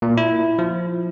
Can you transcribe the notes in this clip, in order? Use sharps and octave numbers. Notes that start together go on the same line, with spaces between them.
A#2
E4
F3